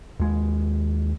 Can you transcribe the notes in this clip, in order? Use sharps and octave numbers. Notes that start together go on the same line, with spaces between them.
D#2 G#3